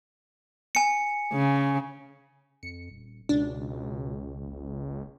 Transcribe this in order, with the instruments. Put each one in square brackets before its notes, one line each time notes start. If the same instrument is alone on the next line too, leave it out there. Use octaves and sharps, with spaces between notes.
[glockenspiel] G#5 C#7
[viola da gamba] C#3
[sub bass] F2 [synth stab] C#7
[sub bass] D#1
[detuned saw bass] C#2 [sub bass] B2 [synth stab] D4
[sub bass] F#1